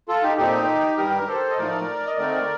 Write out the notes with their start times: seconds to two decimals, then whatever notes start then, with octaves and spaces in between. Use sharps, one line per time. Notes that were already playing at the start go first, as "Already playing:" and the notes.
0.08 F4 A4
0.23 D#4 G4
0.37 A#2 A3 C4 D#4 G4
0.97 G2 D#3 G3 G4 A#4
1.28 A4 C5
1.50 D#5
1.57 A2 F3 A3 D#4 A#4 D5
2.07 D#5
2.18 D3 A3 C4 D#4 A#4 D5